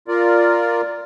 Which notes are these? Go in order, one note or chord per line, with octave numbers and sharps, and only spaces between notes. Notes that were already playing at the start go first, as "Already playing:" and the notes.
F4 A#4 D5